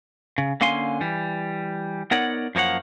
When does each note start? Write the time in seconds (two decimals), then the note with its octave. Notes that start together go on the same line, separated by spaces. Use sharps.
0.38 C#3
0.61 D3 A#3 C#4 F5 G#5 C6
1.01 E3 G3
2.11 B3 D#4 A#4 C#5 D5 F#5
2.55 F#2 F3 A#3 C#5 F#5